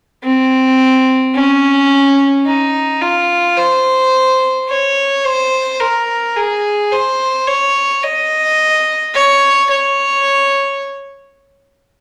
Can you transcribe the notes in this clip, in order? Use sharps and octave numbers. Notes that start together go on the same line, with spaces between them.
C4
C#4
D#4
F4
C5
C#5
C5
A#4
G#4
C5
C#5
D#5
C#5
C#5